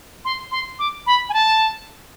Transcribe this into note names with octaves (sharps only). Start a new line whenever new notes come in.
C6
C6
D6
B5
G#5
A5